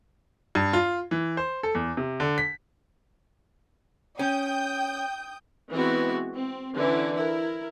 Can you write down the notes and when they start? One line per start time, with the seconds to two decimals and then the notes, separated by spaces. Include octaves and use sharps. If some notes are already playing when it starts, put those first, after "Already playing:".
0.55 G2
0.73 F4
1.11 E3
1.37 C5
1.63 A4
1.75 E2
1.97 C3
2.20 D3
2.38 B6
4.19 C#4 G5 D#6 G6
5.72 E3 G#3 B3 C4 E4 F#4
6.34 C4
6.76 D3 E3 C#4 E4
7.14 E4 A#4